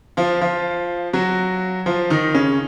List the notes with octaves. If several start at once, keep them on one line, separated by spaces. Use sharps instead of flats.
F3 F4
F3 F4
F#3 F#4
F3 F4
D#3 D#4
C#3 C#4